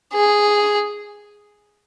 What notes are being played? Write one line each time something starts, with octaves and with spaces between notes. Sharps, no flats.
G#4